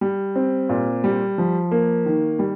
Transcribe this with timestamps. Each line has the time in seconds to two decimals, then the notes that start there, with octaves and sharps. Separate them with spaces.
0.01 G3
0.36 C4
0.69 A#2
1.04 G3
1.38 F3
1.71 A#3
2.06 D#3
2.39 G3